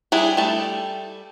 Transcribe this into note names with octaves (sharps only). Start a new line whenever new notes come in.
G3 D4 E4 G#4
G3 A3 A5